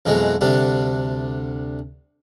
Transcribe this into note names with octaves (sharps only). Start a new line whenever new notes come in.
F2 B2 E3 F#3 G#3
D2 C3 G3 D4